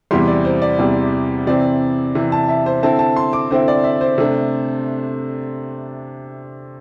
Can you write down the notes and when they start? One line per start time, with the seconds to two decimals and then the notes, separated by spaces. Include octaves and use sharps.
0.11 E2 C3 E3 G3 C6
0.28 D5
0.45 C5
0.62 D5
0.79 E2 C3 E3 G3
1.47 C3 E3 C4 D5
2.15 C3 E3 C4
2.32 A5
2.48 E5
2.66 C5
2.83 D3 C4 E4 A5
2.99 A5
3.16 C6
3.33 D6
3.51 D3 C4 E4 C5
3.68 D5
3.84 E5
4.01 C5
4.18 C3 A3 D4